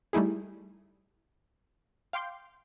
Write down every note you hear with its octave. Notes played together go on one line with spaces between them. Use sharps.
G3 A3 D#4 E4 G#4
F5 G5 C6 D6 G6 C7